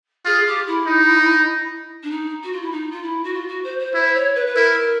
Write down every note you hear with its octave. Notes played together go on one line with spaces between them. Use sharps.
F4 G#4
G4
E4
D#4
D4
D#4
F#4
F4
E4
D#4
F4
E4
F#4
F4
F#4
C5
C5
E4 C5
C#5
B4
B4
E4 A#4